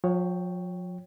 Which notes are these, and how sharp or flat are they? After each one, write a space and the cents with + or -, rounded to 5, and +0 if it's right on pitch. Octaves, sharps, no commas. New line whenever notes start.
F3 +45 C#5 +5 G5 +0